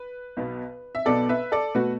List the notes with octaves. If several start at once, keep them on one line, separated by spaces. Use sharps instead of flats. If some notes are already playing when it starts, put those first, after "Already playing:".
Already playing: B4
B1 B2 B3
E5
B1 B2 B3 A4 D5
B4 E5
A4 D5
B2 A3 F#4 B4